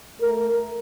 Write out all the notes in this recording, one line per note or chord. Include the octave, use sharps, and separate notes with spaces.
A3 A#4